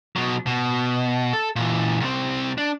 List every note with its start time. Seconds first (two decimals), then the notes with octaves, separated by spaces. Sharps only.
0.16 B2 F#3
0.47 B2
1.33 A4
1.56 A#2 E3
2.00 C2 C4
2.58 D4